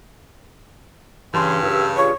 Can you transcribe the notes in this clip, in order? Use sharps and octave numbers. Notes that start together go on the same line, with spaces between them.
G2 C#3 E3 C#4 C6
F#2 C#4 G4 B4 E6
D4 F4 G#4 C#5